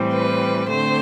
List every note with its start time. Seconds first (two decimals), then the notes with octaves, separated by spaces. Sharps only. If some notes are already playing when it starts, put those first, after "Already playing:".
Already playing: A2 E3 G3 C4
0.11 B4
0.68 D3 A3 C4 C5